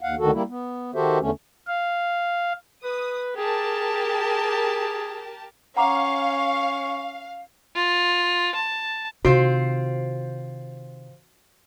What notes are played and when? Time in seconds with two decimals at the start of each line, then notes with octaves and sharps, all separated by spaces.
0.01 D#2 F5 F#5
0.18 D2 D3 D#3 F#4 A4
0.32 G3 A#3 E4
0.49 B3
0.94 D#3 F#4 G4 A4 C5 E5
1.20 E2 D3 A3 C#4
1.67 F5
2.84 B4 D#6
3.36 G4 G#4 A#4 A5
5.77 C#4 F5 F#5 A#5 C#6 D6
7.75 F4
8.55 A5
9.25 C3 D#3 C4 F4 F#4 C5